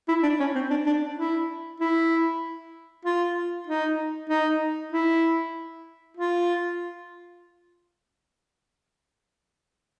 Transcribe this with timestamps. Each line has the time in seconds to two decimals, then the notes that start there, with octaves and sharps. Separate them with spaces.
0.09 E4
0.23 D4
0.40 C#4
0.55 C4
0.71 D4
0.86 D4
1.17 E4
1.80 E4
3.05 F4
3.67 D#4
4.30 D#4
4.92 E4
6.17 F4